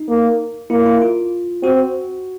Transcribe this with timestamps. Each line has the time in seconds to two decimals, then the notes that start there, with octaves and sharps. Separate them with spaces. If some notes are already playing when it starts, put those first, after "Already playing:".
Already playing: D#4
0.09 A#3
0.70 A#3 E4
0.86 E4
1.02 F4
1.63 C4 F#4